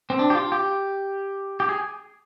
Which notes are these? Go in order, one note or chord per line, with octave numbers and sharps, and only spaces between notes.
C4
D4
G4
F4
G4
G4
G#4